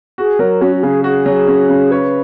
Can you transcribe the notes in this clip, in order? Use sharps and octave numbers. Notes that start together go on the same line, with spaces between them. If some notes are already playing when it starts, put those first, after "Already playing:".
F#4 G#4
F#3 A#4
C#4 F#4
F#4
C#3 G#4
F#4 G#4
F#3
C#4
C#3
B4 C#5